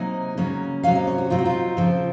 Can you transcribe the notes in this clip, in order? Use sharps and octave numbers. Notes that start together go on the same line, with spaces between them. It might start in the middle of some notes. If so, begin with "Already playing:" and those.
Already playing: C3 F#3 A#3 D#4 G#5
C#3 F#3 A#3 C#4
C3 F#3 A#3 C#4 F5
D#5
C#5
F#4
A#2 F#3 C4 D#4 F4
F#4
F4
C#3 F3 C4